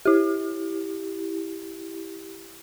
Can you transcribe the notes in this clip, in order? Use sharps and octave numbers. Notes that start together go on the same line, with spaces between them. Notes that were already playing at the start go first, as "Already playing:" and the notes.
E4 G4